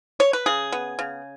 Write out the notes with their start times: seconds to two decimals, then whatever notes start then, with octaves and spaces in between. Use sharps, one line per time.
0.20 C#5
0.33 B4
0.46 C#3 G#4
0.72 B3
0.99 C#3